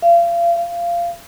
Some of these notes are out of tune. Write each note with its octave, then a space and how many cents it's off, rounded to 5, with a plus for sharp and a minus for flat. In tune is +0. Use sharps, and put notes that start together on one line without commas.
F5 -35
F5 -20